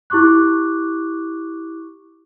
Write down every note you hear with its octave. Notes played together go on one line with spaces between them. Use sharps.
E4 G4 C#6 D6 F#6